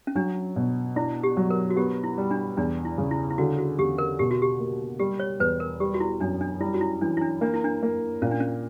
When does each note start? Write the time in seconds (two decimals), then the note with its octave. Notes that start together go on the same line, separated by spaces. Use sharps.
0.07 C#4
0.15 F#3 D4
0.56 B2
0.96 D4 E4
1.23 G4
1.37 F#3
1.50 A#4
1.70 F#4
1.76 B3 G4
2.04 E4
2.18 G3
2.31 D4
2.57 E2 D4
2.85 E4
2.98 C#3
3.11 E4
3.30 E4
3.38 D3 F#4
3.59 F#4
3.78 E2 G4
3.98 A#4
4.19 B2 G4
4.31 F#4
4.42 G4
4.59 A#3
5.00 G3 G4
5.20 C#5
5.40 E2 B4
5.60 A#4
5.80 G3 G4
5.94 F#4
6.00 E4
6.21 F#2 D4
6.41 D4
6.60 G3 E4
6.74 F#4
6.81 E4
7.01 E3 D4
7.17 E4
7.21 D4
7.41 A#3 D4
7.53 E4
7.64 D4
7.83 A#3
8.22 A#2 C#4
8.31 D4
8.40 C#4